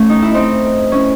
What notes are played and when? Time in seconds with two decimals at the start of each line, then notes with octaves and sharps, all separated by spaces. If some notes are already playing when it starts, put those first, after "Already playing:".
Already playing: A3 C#4
0.09 D#4
0.22 E4
0.34 C4 D#4
0.92 C#4 E4